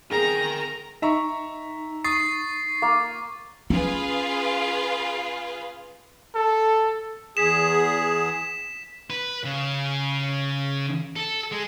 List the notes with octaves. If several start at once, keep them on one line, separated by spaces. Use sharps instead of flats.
B3 C4 G#4 A#4 G5 A#5
D#4 E5 A#5 C#6
C#6 D#6 A6 C7
A#3
C#4 F4 G#4 B4
A4
E2 G#4 B6 E7
B4
C#3
A4
G#3